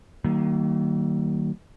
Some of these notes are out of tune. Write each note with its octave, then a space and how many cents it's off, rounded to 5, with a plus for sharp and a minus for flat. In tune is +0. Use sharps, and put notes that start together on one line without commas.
D#3 +0 F#3 +45 A#3 -15